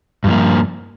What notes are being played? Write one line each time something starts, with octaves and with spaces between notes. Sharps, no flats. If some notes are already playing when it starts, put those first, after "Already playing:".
G2 F3 A#3